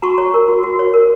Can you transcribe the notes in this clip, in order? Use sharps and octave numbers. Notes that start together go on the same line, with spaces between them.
F#4 A#5 C#6
C#5
A#4
F#4
F#4
C#5
A#4